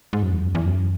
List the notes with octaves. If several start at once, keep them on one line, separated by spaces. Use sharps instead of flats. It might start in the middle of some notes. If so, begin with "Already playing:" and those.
G#2
F#2
E2
F#2
E2
F#2